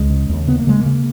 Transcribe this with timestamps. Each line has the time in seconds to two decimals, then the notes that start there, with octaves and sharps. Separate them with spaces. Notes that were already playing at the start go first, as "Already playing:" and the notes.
Already playing: C#2 G#3
0.10 C#3
0.29 D#2
0.47 C#3 B3
0.59 A#3
0.67 C#3 G#3
0.80 A#3
0.86 C#3